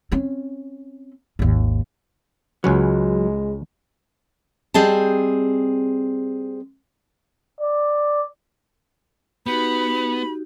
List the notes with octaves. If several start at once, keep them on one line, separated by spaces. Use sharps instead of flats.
C4 C#4
G#1 D#2
C#2 F#3 G#3 C#4 B4
G3 C4 G#4 D#5 A5
D5
B3 D#4 F#4 G4 B5